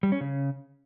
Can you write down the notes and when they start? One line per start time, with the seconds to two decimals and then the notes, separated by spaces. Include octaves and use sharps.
0.03 G3
0.12 C#4
0.21 C#3